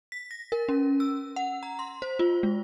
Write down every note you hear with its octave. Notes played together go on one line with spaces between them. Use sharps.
B6
A#6
A#4
C#4
E6
F#5
A#5
C6
C5
F4
G#3